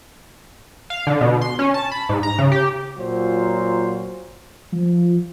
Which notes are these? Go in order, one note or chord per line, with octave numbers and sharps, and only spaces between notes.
F5
D3
B2
C6
C#4
A5
B5
G#2
A#5
C#3
G4
A#2 F#3 F4 F#4 C5
F3